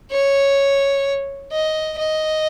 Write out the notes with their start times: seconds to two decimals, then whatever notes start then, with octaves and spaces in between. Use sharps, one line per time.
0.12 C#5
1.52 D#5
1.99 D#5